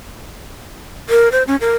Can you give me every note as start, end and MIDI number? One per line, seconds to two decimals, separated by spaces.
1.09 1.31 70
1.32 1.43 72
1.47 1.56 61
1.61 1.76 70